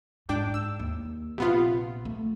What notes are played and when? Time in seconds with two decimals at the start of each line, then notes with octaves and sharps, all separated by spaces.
0.29 G#2 D4 G5 D6
0.54 E6
0.79 D#2
1.38 A#1 C3 B3 F4
2.05 A3